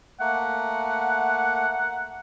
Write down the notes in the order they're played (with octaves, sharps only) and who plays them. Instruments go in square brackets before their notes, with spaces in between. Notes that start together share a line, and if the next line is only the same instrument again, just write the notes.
[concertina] A3 A#3 [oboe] F#5